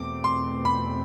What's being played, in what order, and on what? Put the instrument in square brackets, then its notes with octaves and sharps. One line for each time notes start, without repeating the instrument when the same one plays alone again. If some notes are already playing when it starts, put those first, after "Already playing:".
Already playing: [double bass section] E2 B2 A3 C4 [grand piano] D6
[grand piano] C6
B5